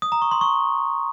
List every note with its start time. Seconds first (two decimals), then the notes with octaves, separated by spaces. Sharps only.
0.02 D#6
0.12 A#5
0.22 C#6
0.31 C6
0.41 C#6